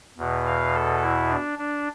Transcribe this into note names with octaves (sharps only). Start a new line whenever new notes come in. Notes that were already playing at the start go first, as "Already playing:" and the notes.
E2 B2
F5
A4
E4
D4
D4